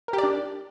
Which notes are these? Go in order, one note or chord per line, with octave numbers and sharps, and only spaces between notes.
A#4
G4
D5
D4